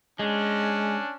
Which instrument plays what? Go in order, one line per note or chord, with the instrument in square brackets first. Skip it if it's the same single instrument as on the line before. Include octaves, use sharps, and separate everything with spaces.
[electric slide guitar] G#3 [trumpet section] C#4 D4